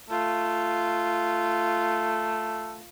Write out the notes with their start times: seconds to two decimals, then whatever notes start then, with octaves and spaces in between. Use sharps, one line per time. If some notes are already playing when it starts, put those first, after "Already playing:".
0.10 A3 F4